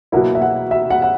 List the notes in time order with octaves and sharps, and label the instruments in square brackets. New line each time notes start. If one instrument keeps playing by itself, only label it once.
[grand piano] B2 F#3 A#3 E4 [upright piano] F#5
[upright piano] E5
F#5
E5
F#5
F#5